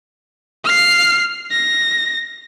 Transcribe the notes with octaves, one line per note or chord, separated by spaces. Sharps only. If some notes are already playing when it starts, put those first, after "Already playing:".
F6 C7
A#6